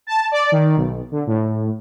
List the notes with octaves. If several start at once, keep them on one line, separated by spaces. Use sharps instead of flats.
A5
D5
D#3
B1
D3
A2